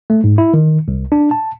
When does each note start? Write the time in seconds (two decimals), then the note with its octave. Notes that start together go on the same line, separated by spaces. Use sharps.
0.10 A3
0.24 G#2
0.38 E4
0.54 D#3
0.88 C2
1.12 D4
1.31 A5